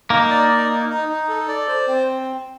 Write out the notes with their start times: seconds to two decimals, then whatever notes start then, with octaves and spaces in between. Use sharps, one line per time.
0.10 A#3 D#4
0.30 D5
0.50 D#4
0.69 D#4
0.89 D#4
1.08 D#4
1.29 A4
1.48 D5
1.68 C5
1.88 C4